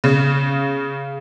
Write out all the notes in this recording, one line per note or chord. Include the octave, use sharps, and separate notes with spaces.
C#3